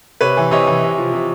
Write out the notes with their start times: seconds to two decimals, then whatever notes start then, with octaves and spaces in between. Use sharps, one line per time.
0.21 C3 B4 C#5
0.37 E3
0.51 C3 C#5 D#5
0.67 E3
0.83 C3
0.98 F3
1.13 C3